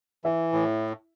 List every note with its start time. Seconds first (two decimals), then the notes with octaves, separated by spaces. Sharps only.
0.24 E3 E4 E5
0.53 A2